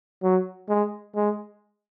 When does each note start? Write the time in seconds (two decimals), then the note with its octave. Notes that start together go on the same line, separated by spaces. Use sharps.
0.23 F#3
0.69 G#3
1.16 G#3